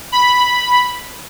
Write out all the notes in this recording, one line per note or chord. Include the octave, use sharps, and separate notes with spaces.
B5